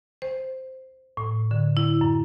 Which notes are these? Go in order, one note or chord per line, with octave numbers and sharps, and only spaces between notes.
C5
A2
D3
E4
F#2